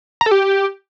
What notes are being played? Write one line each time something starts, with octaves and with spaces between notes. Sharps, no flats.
A#5
A4
G4